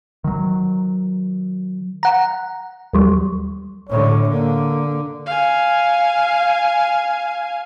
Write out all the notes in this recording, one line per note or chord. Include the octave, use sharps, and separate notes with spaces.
D#3 F#3
F#5 A#5
D#2 F#3 G3
A2 D3 C#5
D3 A#3
F5 G#5